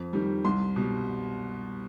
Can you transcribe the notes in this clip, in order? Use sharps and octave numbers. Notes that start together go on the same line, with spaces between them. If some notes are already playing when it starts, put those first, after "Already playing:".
Already playing: F2
D#3 G3
C2 C6
B2 G3